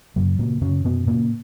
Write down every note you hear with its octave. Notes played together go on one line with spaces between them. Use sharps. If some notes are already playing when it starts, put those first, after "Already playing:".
F#2 C#3 F#3
A#2 C#3 A#3
F#2 C#3 C#4
F#2 B2 B3
A#2 C#3 A#3